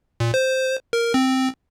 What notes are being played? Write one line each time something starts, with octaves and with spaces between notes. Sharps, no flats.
A#2
C5
A#4
C4